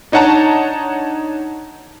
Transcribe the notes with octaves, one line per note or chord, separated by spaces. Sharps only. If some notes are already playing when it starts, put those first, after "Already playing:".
D4 D#4 C#5 F#5 A5 A#5